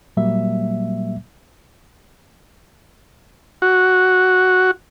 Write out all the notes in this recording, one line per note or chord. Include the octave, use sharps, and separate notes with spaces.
A#2 F#3 G3 A#3 E5
F#4